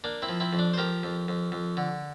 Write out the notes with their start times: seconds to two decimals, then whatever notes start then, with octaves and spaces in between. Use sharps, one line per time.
0.04 A#3 D4
0.22 C4 E4
0.29 F3
0.40 C4 E4
0.53 F2
0.59 D4
0.74 C5
0.77 F3 G4 A#4
1.03 F2
1.28 F2
1.52 F2
1.77 D3